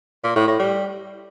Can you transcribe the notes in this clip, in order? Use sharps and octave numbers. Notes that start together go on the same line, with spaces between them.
A#2
A2
A2
G3